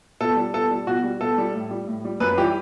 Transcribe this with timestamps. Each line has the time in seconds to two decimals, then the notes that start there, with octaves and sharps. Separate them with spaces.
0.20 B2 A4
0.37 G3
0.54 B2 A4
0.71 G3
0.87 B2 F#4
1.04 G3
1.21 B2 A4
1.38 G3
1.54 A2
1.71 G3
1.87 A2
2.05 G3
2.20 F#2 B4
2.38 E3 G3 G4